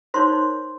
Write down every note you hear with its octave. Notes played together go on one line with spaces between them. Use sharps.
D#4 A#4 C5 C#5 C6